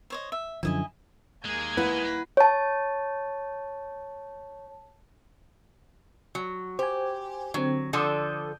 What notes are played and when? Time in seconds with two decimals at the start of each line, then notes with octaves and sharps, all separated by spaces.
0.10 C5 C#5 D#5
0.32 E5
0.63 F#2 D3 F3 E4 D#5 G#5
1.45 D#2 G#3 A#3 G#4 G#6
1.77 E4 B4 F#5
2.37 C#5 A5
6.35 F#3
6.79 G4 C5 G#5
7.54 D3 F#3 C4
7.93 D3 F3 A4 D6 D#6 G6